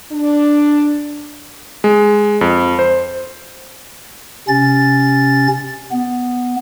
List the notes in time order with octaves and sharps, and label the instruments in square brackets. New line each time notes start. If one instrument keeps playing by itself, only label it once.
[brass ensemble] D4
[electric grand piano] G#3
F2
C5
[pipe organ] C3 C#4 A6
B3